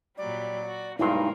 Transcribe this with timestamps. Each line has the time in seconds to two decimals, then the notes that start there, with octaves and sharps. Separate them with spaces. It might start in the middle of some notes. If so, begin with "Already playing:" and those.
0.18 A#2 F#3 G3 D5
0.65 F#4
0.99 B1 G2 G#3 A#3 D#4 E4 C6